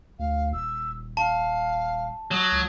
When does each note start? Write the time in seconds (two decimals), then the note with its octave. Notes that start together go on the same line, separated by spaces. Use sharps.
0.19 D2 F5
0.53 D#1 E6
1.17 F5 A5
2.31 F#3 D#6
2.52 C#2